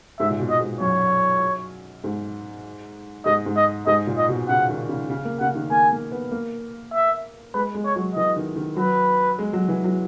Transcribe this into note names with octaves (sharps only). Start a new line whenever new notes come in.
G#2 E5
A#2
B2
D#5
G#2
F#2 C#5
G#2
G#2 D#5
G#2
D#5
G#2 D#5
A#2
D#5
B2
C#3 F#5
D#3
C#3
C#3
A#3
C#3 F#5
D#3
A#3 G#5
A#3
B3
A#3
E5
G#3 B4
G#3
C#5
F#3
E3 D#5
D#3
D#3
F#3 B4
G#3
F#3
E3
F#3